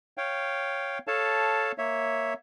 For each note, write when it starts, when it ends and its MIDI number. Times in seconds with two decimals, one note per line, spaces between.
0.17 0.99 73
0.17 0.99 77
0.17 0.99 79
1.07 1.72 69
1.07 1.72 73
1.07 1.72 77
1.07 1.72 81
1.78 2.34 58
1.78 2.34 73
1.78 2.34 76